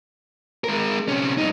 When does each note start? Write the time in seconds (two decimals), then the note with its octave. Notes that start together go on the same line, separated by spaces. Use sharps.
0.64 G#3 A#4
1.08 C3 C#4
1.38 G2 D#4